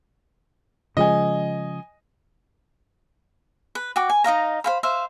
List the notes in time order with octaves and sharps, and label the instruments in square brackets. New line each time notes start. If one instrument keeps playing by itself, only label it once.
[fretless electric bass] C#3 F3 G#3 [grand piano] D#5 G#5
[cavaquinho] B4
F#4 G5 D6
G#5
D#4 D#5 F5 A#5
C5 F5 B5
C5 E5 F5